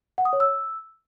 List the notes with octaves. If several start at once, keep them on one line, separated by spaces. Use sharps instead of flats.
F#5
D#6
C#5
E6